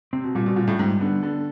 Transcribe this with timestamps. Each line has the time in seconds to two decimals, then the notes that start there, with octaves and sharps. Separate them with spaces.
0.13 C3 C4
0.24 B2
0.35 A#2 G3
0.46 B2
0.56 A#2 F4
0.68 A2
0.79 G#2 G3
1.00 D3 B3
1.23 D3 A4